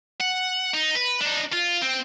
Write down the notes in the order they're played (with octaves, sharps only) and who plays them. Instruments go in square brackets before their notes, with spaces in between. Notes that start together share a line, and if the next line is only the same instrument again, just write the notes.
[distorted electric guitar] F#5
D#4
B4
D4 D#4
F4
C4